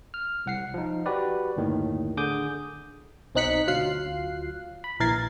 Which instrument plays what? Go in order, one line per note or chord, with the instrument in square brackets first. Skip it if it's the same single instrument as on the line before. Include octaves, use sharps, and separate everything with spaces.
[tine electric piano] F6
C2 F#5 C7
F3 D#4
F#4 G4 B4 D5
G1 D#2 A2 D#3
D3 G#4 D6 D#6 G6
[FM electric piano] B1 C4 D#4 F#6 B6 C#7
D2 F#3 F4 F5 F#6 C7
B5
A#1 E3 A#4 G#6 A6 C7